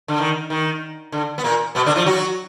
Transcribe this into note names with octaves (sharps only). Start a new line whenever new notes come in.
D3
D#3
D#3
D3
B3
A#2 A#3
B2 B3
D3 D4
F3 F4
F#3 F#4